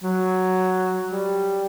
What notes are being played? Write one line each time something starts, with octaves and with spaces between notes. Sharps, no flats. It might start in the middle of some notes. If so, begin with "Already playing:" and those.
F#3
G3